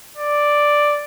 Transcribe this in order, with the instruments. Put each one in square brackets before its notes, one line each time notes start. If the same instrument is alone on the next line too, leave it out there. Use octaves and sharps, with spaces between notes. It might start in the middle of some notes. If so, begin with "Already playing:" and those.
[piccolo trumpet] D5